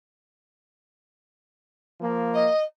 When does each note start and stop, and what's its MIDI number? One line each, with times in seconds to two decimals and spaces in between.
2.01 2.46 53
2.01 2.46 58
2.33 2.62 75